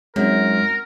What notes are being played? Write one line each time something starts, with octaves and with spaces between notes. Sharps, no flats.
F#2 G#3 C4 D#4 A#4